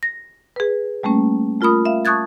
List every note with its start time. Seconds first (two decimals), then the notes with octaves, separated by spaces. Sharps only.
0.03 A#6
0.56 G#4 B4
1.03 G3 A3 A#3 C#4
1.61 A3 F4 A#4 B5 D#6
1.85 E5 F5
2.05 A5 C#6 D#6 F#6 G#6 A6